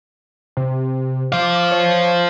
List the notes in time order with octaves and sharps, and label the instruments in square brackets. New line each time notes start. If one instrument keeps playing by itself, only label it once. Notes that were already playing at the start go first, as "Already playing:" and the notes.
[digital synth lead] C3
[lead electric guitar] C5 F5 [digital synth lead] D6
[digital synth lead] C#5